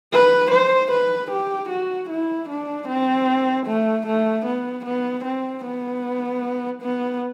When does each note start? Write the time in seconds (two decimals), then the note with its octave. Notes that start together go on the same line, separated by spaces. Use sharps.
0.13 B4
0.51 C5
0.92 B4
1.31 G4
1.69 F#4
2.10 E4
2.49 D4
2.88 C4
3.67 A3
4.07 A3
4.46 B3
4.86 B3
5.25 C4
5.65 B3
6.82 B3